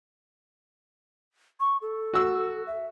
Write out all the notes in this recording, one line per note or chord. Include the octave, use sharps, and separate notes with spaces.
C#6
A4
F#4 E6
E5